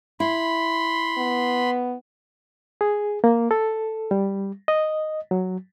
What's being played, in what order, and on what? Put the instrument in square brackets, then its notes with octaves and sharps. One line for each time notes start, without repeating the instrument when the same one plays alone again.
[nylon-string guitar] E4 [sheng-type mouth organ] B5 C6
[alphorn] B3
[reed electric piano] G#4
A#3
A4
G3
D#5
F#3